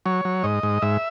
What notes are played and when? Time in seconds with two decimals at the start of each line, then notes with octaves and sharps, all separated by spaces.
0.06 F#3 C#5
0.25 F#3
0.44 G#2 D#5
0.63 G#2
0.82 G#2 E5